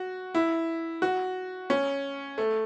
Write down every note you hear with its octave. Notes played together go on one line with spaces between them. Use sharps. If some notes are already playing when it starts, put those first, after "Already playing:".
Already playing: F#4
E4
F#4
C#4
A3